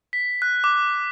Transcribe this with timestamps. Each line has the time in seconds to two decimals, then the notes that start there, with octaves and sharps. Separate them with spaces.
0.13 B6
0.42 F#6
0.64 D6